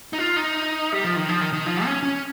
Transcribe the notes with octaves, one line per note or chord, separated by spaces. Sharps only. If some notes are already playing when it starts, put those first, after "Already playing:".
D#4
F4
D#4
G3
F3
D#3
F3
D#3
D#3
F3
C#4
C#4